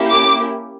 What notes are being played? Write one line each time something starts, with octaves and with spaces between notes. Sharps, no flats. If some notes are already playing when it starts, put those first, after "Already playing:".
Already playing: A#3 C#4 E4 G4
D6